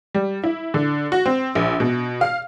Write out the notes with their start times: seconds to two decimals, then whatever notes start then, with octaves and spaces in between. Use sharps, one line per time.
0.14 G3
0.44 E4
0.74 D3
1.12 F#4
1.26 C4
1.55 A#1
1.80 B2
2.21 F5